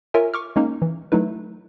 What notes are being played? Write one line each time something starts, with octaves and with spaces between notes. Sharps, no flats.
F4 A#4 C#5 E5 G#5
C#6 D6 F6
G#3 A#3 C#4 D#4
E3
F#3 A3 D#4 E4 B4